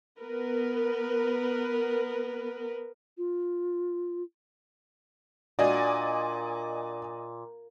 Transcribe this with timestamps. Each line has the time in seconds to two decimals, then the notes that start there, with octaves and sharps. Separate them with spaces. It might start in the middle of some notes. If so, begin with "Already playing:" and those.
0.19 B3 A#4 B4
3.18 F4
5.59 A#2 D4 F#4 D5 D#5 G#5